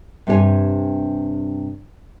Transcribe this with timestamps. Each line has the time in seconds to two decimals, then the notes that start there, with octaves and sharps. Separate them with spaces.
0.27 G2 C3 D4 G#4 C#5 G#5